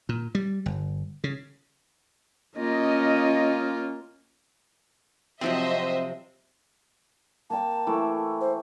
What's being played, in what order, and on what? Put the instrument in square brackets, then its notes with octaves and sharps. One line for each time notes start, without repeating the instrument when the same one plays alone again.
[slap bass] A#2
G3
G1
C#3
[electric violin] A#3 F4 [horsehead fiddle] C#4 [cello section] D#5
[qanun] C3 F3 F#3 [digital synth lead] C4 [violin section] C5 D#5 E5
[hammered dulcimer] A#3 G5 [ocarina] A5
[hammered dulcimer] E3 A3
[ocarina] C5